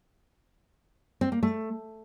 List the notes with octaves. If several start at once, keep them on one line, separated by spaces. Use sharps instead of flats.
C4
A#3
A3